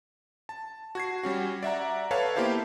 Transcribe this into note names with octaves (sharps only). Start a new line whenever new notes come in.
A5
F#4 G#6 C7
G3 C#4 F#4
D5 E5 F#5 A#5
A4 B4 C#5 F5 A5
A#3 B3 E4 G4 C5 F5